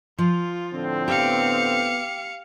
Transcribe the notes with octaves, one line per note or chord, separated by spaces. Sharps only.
F3 F4
A2 D3 C4
B3 G4 F5 C#7